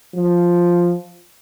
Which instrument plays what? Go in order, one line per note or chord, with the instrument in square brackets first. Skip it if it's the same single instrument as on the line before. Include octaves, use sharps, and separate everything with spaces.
[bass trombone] F3